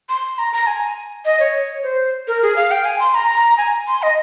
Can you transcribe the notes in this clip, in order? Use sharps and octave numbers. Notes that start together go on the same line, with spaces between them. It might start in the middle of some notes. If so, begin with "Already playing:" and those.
C6
A#5
A#5
G#5
D#5
C#5
C5
A#4
G#4
F5
G5
G#5
C6
A#5
G#5
C6
D#5